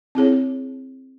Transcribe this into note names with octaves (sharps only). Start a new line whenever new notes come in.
C4 E4 G#4 C#5